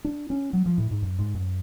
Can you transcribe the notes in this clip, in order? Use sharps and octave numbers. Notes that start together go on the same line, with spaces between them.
D4
C#4
F#3
F3
A2
G#2
F#2
G#2
F#2